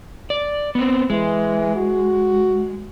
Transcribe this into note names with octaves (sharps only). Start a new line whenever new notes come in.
D5
B3 C4
E3 G#3
F#4